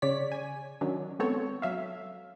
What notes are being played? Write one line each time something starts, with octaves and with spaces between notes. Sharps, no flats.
C#3 C#5 D5 B6
G#5
D#3 F#3 C#4 D4
G#3 B3 C4 A4 C#5
F#3 E5 F5